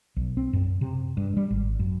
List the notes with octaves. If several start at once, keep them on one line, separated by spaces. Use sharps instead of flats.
B1
C4
F#2
C3
G2
G3
G#1
F#2